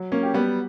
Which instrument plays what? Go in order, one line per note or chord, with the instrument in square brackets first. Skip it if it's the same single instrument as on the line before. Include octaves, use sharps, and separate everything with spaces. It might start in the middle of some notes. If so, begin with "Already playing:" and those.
Already playing: [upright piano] F#3
[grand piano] A#3 C#4
[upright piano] G4
[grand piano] G3 B3